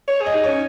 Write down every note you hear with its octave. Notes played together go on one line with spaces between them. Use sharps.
C#5
G#4 D#5
D#4
C#4 C#5